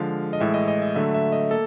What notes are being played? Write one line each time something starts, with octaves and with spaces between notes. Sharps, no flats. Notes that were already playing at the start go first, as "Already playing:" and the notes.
Already playing: D3 F3 G#3 F5
D#5
A2 E3 G#3 E5
D#5
D#5
E5
D3 F#3 A3 E5
E5
D#5
A#3 A4